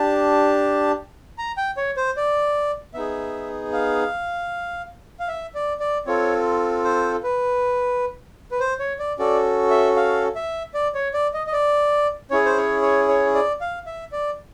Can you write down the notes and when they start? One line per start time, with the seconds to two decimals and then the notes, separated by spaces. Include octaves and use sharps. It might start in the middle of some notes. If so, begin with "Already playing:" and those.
Already playing: D4 G4 A5
1.38 A#5
1.57 G5
1.77 C#5
1.97 C5
2.17 D5
2.94 B3 D#4 G#4 E5
3.73 F5
5.20 F5
5.28 E5
5.55 D5
5.80 D5
6.06 C4 F4 A4 C#5
6.84 C5
7.23 B4
8.51 B4
8.60 C5
8.79 C#5
8.99 D5
9.19 C#4 F#4 A4 D5
9.70 E5
9.96 F5
10.36 E5
10.74 D5
10.95 C#5
11.14 D5
11.34 D#5
11.47 D#5
11.53 D5
12.31 C#4 E4 G#4 C#5
12.45 C5
12.57 C#5
12.82 C#5
13.08 C#5
13.34 D5
13.61 F5
13.86 E5
14.12 D5